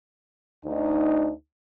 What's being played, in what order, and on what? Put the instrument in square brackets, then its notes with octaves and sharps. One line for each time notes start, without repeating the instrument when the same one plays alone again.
[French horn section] D2 D#4